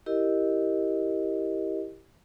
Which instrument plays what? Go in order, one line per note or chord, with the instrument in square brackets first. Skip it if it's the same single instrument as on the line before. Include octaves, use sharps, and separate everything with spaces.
[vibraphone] E4 G4 A#4 D#5